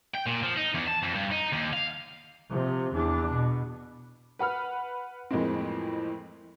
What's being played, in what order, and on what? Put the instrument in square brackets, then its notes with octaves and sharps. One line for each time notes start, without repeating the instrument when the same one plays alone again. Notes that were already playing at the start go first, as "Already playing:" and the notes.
[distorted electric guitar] G5
A#2
F3
D#4
E2
A5
F2
G2
D#4
D#2
F5
[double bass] C3 F3
E2 D4
B2
[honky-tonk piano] B4 F#5 B5 F6
F2 A2 E3 G#3 A#3 C4